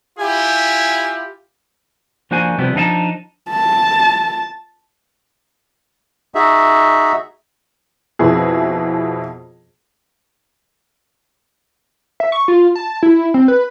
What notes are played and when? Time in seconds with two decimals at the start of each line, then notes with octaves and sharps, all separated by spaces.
0.19 E4 F4 G4 G#5
2.31 F3 A#3 D4 F#4 C5 G#5
2.58 C3 F3 G3 B3 C4
2.75 F3 D4 D#4 F5 A5
3.51 A5
6.35 D#4 F#4 G#4 E5
8.19 F2 B2 E4 G#4
12.20 E5
12.32 C#6
12.48 F4
12.76 A5
13.03 E4
13.34 C4
13.48 B4